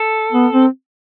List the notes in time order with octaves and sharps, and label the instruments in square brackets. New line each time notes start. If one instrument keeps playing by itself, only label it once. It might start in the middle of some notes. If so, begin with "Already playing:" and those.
Already playing: [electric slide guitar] A4
[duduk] B3
C4